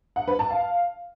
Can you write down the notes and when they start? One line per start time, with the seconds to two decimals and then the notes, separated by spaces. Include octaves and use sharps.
0.16 F#5
0.28 B4
0.39 A5
0.51 F5